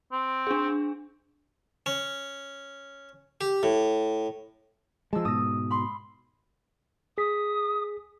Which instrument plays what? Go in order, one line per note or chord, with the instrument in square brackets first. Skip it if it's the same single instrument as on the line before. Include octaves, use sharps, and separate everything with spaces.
[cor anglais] C4
[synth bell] D4 G#4
[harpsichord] C#4
G4
A2
[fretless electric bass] F3 G#3 [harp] A5 E6
[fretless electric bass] G#2 B2 [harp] D#6 A#6
[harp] B5 C6
[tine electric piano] G#4 B6 [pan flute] D#6